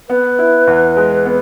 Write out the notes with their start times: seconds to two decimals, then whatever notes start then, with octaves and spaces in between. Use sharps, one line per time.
0.09 B3 B4
0.39 E4
0.67 E2
0.97 G#3
1.26 B3